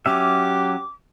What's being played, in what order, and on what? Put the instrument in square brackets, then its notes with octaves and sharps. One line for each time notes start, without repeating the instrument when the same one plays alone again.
[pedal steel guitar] F#3 C#4 E5 [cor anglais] G4 [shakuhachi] D6